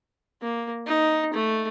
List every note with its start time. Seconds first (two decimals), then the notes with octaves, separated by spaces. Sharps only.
0.42 A#3
0.86 D#4
1.33 A3